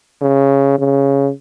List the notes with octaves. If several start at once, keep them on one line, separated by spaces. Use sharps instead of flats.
C#3
C#3